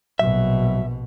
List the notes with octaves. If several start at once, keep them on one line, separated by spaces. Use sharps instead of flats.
A#1 B2 F#3 E5